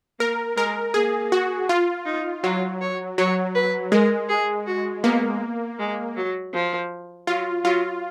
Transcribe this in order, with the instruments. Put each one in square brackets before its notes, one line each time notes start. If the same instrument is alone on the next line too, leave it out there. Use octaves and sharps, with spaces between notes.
[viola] A#3 [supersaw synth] A#4
[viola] G#3 [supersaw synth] A#4
[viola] A#3 [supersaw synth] G#4
[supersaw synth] F#4
F4
[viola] D#4
[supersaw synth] F#3 [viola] F4
[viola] C#5
[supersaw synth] F#3 [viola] C#5
[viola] B4
[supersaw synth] G#3 [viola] A#4
[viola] G#4
F#4
[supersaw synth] A#3 [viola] B3
[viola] G#3
F#3
F3
[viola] F#3 [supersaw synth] F4
[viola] F#3 [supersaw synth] F4